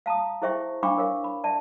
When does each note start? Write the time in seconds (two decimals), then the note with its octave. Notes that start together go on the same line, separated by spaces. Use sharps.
0.06 F5 A5 A#5 D#6
0.42 E4 G#4 C5 E5 G5 C#6
0.83 D4 F5 G5 B5 C#6 D6
0.98 A#4 C#5 F5
1.24 B5
1.44 D5 E5 A5